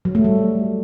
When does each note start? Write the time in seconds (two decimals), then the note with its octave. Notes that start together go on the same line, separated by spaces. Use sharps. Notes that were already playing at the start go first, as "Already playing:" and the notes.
0.05 F#3
0.15 A3
0.25 G3